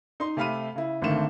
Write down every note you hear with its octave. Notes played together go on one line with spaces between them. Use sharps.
D#4 C6
C3 A3 F5 B5 F6 D#7
C#3 E4
G#1 D3 D#3 A3 E7